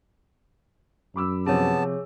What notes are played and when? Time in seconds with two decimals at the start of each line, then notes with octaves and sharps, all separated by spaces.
1.16 F#2 B5 D6 E6
1.46 C3 F3 B3 G#4 C#5 A5